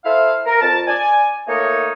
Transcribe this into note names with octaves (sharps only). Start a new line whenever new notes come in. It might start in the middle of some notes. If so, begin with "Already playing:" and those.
E4 A4 C5 E5 F5
A#4
F2 A5
D5 G#5
A3 A#3 D#4 C#5